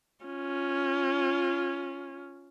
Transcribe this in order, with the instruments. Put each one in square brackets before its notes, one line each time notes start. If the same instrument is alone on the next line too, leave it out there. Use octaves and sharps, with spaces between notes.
[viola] C#4 F4